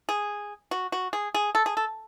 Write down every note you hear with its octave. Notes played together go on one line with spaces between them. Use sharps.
G#4
F#4
F#4
G#4
G#4
A4
G#4
A4